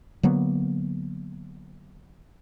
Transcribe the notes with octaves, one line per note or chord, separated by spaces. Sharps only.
D3 F#3 A#3 B3